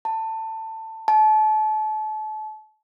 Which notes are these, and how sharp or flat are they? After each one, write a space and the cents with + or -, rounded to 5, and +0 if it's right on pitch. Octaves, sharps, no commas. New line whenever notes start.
A5 +20
A5 -35